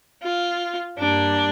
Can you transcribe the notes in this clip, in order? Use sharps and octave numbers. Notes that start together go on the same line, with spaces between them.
F4
G2 G3 A#3 D4